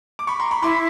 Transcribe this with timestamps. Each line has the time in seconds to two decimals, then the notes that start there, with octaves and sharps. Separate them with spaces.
0.19 D6
0.27 B5 C#6
0.40 A#5 C6
0.51 B5 C#6
0.62 E4 C6 D6